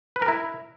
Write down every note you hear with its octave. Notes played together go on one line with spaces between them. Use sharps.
B4
A#4
E4